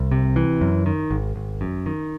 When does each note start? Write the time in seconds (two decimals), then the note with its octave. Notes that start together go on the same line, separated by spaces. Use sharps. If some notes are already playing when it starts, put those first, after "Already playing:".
Already playing: C2
0.12 C3
0.36 E3
0.61 F#2
0.86 D#3
1.11 G#1
1.36 G#1
1.61 F#2
1.86 D#3